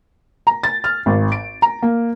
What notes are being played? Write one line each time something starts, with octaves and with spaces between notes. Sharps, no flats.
A#5
A6
F6
G#1
D7
A#5
A#3